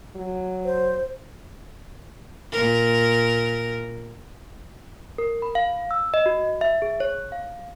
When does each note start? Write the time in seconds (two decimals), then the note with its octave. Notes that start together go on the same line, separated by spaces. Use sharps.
0.16 F#3
0.65 C5
2.53 A#2 A#4
5.18 A#4
5.42 B5
5.55 F5
5.91 E6
6.14 D#5
6.26 F#4
6.61 E5
6.82 G#4
7.00 C#5
7.32 F5